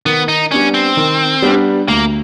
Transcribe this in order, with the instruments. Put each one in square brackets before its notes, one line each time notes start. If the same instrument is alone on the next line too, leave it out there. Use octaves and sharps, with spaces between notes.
[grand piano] D#3 [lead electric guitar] B3
[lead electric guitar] D#4
[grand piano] G3 B3 D4 [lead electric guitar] C#4
[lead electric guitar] C4
[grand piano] D#3
G3 B3 D4
[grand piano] D2 [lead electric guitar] A#3